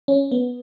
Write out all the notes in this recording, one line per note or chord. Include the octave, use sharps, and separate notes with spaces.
C#4
B3